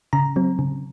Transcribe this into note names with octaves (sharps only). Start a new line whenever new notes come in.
C#3 A#5
F#3 C4
C#3